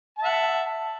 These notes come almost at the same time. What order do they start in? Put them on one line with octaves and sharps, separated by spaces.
A5 E5 F#5